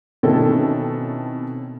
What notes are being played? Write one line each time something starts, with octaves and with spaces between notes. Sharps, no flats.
B2 D#3 C4 C#4 E4 A4